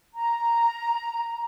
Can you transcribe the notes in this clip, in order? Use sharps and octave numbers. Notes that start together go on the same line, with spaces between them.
A#5